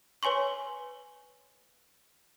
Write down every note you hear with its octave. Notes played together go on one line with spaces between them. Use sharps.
B4 C#5 G#5 C6 C#6